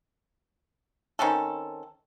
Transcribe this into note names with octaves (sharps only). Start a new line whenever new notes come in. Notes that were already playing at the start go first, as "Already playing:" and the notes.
D#3 C4 C#4 A4